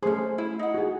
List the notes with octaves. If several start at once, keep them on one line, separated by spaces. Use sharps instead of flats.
A3 C#4 G#4 C5
E4
D#4 F#5
F#4 G#4